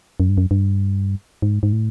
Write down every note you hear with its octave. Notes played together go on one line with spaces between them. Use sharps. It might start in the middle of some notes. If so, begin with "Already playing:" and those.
F#2
G2
F#2
G2
G#2
G#2
A2